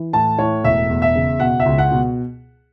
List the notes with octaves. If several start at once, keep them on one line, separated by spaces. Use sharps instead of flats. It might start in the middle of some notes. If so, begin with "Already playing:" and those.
Already playing: E3
A2 A5
A2 C#5
E1 E5
E2
E5
C#3
B2 F#5
E5
C#2
F#5
B2